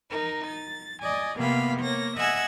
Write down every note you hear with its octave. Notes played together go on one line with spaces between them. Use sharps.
D#4 A#4
A6
D5 D#5 G#5
C3 A#3 B3 F5 B5
A#3 C#5 A#6
D#5 E5 F#5 G#5 E6 G#6